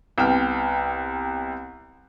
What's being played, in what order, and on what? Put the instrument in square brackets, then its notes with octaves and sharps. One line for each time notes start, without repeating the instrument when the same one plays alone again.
[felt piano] C2 B3 G5 F6